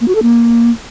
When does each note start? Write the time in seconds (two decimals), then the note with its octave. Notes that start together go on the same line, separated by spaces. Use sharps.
0.01 A#3
0.08 F#4
0.15 A4
0.22 A#3